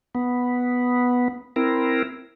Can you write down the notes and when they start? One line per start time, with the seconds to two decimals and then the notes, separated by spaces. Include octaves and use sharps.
0.15 B3
1.56 C4 E4 A#4